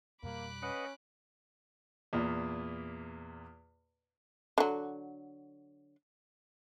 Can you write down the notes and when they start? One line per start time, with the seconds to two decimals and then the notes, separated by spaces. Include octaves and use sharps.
0.23 F2 B2 G3 A#3 B5 D6 F#6
0.62 C#4 B4 D#5 F#5
2.13 E2 A#2
4.58 D3 F#3